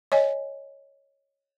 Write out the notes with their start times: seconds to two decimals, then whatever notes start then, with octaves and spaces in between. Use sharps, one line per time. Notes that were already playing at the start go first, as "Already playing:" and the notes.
0.12 C#5 D#5 G#5